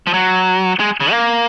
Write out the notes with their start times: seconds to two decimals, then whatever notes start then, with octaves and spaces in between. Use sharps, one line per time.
0.07 F3
0.14 F#3
0.80 G#3
1.01 C#3
1.11 A#3